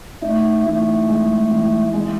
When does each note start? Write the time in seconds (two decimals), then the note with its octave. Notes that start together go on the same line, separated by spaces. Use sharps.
0.22 A3 D#4
0.65 E3 A3
1.08 G#3
1.51 E3
1.94 G#3